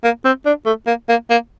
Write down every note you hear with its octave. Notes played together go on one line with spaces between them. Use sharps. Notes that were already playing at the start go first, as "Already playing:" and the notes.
A#3
C4
D4
A3
A#3
A#3
A#3